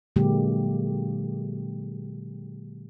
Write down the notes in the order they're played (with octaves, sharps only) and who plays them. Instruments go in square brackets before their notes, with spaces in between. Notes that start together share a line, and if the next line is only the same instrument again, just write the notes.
[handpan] A#2 D3 F#3 G#3 A#3 G4